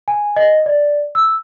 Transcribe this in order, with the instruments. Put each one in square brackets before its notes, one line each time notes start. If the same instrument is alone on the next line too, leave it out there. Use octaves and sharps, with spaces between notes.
[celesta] G#5
D#5
D5
E6